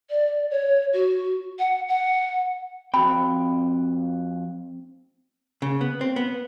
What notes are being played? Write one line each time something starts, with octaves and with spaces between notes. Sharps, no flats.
D5
C#5
F#4
F#5
F#5
F2 C4 F#4 G5 B5
C#3
B3
C4
B3